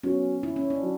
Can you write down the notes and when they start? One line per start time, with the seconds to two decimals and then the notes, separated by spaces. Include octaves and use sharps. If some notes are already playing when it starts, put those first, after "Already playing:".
0.03 F#3 B3 C#4 F#4
0.43 E4
0.56 C#4
0.70 D4
0.82 F#3